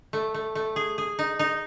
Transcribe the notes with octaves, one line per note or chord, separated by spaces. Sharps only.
A3
A3
A3
G#4
G#4
D#4
D#4